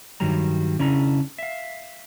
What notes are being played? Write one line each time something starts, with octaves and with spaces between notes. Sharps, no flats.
G2 D#3 F#3 G3 A#5
C#3 C#4 D4 E4 A#5
E5 F5